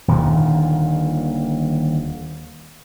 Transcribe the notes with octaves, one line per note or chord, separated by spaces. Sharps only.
D#1 D#2 A#2 D3